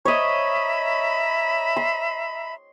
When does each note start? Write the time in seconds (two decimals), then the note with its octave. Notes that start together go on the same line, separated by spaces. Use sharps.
0.05 C#5 D#5 E5 A#5 B5
1.77 C6